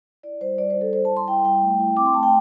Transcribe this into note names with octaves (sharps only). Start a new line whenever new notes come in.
E4 D5
G3 C5
G3 D5
C5
E4
A4
E4 C5
A5
G3
C6
E4 G5
G3 G5
A3
E4
C4 D6
C6
A3 A5
G5